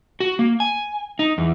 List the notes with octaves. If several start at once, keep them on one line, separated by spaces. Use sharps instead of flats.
F#4
A#3
G#5
D#4
E2